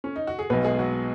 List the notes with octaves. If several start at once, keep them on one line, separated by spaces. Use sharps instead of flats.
C#4
D#4
F#4
G#4
B1 B2 B3 B4
G#3 G#4
F#3 F#4